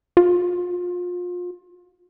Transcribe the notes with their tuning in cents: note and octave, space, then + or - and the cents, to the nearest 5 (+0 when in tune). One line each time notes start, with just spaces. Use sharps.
F4 +30